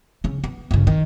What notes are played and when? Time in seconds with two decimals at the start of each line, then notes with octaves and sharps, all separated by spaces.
0.24 C#3 C#4
0.44 B3
0.71 G1 C#3
0.87 D#3